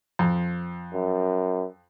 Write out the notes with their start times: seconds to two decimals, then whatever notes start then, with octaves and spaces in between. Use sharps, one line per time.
0.19 F2
0.94 F#2